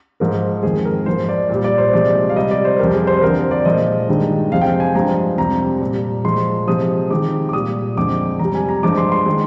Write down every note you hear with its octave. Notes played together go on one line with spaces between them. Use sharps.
G#2 F3 G#3 A#4
F2 D#3 G#3 G#4
A#4
G#2 F3 G#3 C5
D5
A#2 G3
D5
C5
C3 F3 G#3 D5
F5
C3 G3 D#5
D5
C5
F2 C3 G3 A#4
G#4
C5
F2 D3 F3 A#4
D5
A#2 F3 G#3 D#5
G2 D#3 G#3
F2 C3 F3 G#3 F5
G5
F5
G#5
G2 F3 G#3 A#5
F2 C3 G3 A#5
A#2 G3
A#2 F3 G#3 C6
C3 F3 G#3 D#6
C3 D#3 G#3 D6
D6
A#2 G3 D#6
F2 D3 G#3 D6
F2 C3 G3 A#5
G#5
A#5
G2 F3 G#3 D6
C6
C6
D#3 G#3